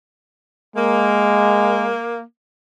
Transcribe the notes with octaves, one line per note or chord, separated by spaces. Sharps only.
G#3 A#3